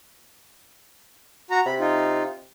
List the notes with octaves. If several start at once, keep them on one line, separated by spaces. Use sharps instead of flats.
F#4 A#5
C3 B5
D#4 F4